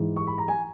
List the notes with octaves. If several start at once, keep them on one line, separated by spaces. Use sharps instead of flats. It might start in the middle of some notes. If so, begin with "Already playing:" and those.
Already playing: G#2 E3
C#6
B5
A#5
G#5